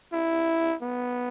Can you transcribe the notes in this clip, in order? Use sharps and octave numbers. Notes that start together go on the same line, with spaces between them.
E4
B3